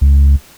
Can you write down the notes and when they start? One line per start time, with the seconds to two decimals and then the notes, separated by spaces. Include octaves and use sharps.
0.01 C#2